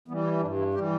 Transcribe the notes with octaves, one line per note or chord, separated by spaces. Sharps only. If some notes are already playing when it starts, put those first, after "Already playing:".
E3 G3 B3
E4
G2 D4
E4
E3 G3 G4